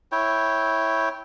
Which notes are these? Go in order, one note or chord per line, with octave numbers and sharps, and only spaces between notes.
E4 C#5 G5